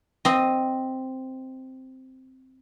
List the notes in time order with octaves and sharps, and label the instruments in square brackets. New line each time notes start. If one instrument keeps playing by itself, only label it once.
[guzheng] C4 D#5